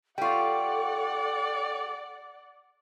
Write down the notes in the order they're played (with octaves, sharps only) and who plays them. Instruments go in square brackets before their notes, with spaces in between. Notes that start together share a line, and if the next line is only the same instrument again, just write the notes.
[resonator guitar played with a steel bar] G3 F4 [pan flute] A4 [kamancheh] D5 F#5 [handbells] G5 C#6